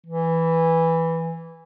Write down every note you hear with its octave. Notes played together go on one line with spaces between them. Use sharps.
E3